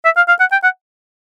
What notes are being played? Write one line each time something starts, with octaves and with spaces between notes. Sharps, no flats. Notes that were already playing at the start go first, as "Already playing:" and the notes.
E5
F5
F5
F#5
G5
F#5